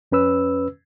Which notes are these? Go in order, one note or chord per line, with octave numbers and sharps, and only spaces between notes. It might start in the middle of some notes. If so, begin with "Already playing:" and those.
F2 C#4 B4 E6